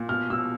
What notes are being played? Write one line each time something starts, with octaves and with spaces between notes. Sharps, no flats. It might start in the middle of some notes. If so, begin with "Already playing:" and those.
Already playing: A#2
B2 F6
B2 E6